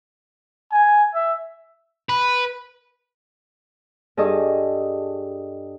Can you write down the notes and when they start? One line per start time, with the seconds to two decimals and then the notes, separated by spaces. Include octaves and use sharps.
0.72 G#5
1.14 E5
2.09 B4
4.17 G2 G#4 A4 D#5 C#6